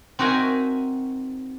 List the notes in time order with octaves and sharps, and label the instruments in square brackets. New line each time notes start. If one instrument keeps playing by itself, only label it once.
[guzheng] C4 D#4 F#4 A#4 E5 G#5